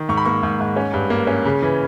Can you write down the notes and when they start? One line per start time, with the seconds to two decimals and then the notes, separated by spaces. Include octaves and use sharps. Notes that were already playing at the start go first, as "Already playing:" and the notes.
Already playing: D#3
0.09 G#2 C#6
0.17 B5
0.25 A#3 C#6
0.43 G#2
0.60 G#2
0.76 C#4
0.94 G2
1.10 A#3
1.27 C#4
1.45 C#3
1.62 E3